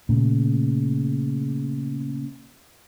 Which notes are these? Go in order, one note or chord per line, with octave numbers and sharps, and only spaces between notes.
A#2 C#3 A3